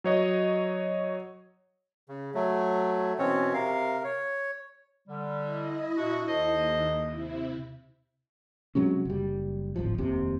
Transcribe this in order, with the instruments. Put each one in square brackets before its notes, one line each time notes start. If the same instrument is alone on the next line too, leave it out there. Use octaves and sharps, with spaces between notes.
[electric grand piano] F#3 C#5 D#5
[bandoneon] C#3
F#3 A3
B2 E3 C4 C#4 C#5
C3 A#4 F5
C#5
[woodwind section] D3 G3
[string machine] E4 D#5
[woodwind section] A#2 D4 F#4
[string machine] D#2 [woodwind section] A4 C5 D#5
[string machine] C3 E4
[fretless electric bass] C3 F#3 G#3 C#4
F#1 G3
D1 G#1 F3
F1 D#2 C3